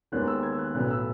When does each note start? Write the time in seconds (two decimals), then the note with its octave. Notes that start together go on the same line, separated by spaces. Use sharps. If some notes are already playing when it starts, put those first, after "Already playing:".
0.12 D#2 D#3 G#3 B3 F#6
0.28 E6
0.43 G#6
0.52 E6
0.59 F#6
0.74 B1 A2 F#3 B3 F#6
0.91 E6